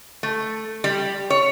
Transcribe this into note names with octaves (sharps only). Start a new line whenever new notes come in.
A3
G3
C#5